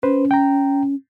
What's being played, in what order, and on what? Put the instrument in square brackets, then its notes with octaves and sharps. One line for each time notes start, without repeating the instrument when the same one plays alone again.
[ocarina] C#4 [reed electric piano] B4 C5
[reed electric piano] G5 A#5